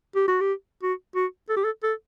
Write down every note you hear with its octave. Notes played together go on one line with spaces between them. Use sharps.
G4
F#4
G4
F#4
F#4
A4
G4
A4
A4